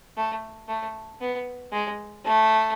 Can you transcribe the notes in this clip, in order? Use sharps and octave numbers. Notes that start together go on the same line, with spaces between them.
A3
A3
B3
G#3
A3